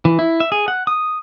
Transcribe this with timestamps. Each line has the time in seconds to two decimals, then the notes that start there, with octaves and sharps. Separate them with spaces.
0.05 E3
0.19 E4
0.40 E5
0.52 G#4
0.68 F#5
0.87 D#6